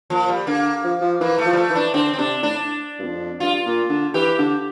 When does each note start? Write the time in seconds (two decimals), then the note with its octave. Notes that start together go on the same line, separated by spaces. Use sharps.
0.10 A#2 F3
0.28 G3
0.47 D3 A#3
0.84 F3
1.01 F3
1.20 E3 A#3
1.38 A3
1.45 F3
1.53 G3
1.57 A3
1.70 E3
1.75 D4
1.94 D3 C4
2.13 C4
2.18 C3 D4
2.42 A2 D4
2.99 G2
3.04 F2
3.40 G2 F4
3.65 A#2
3.89 D3
4.14 E3 G4
4.39 D3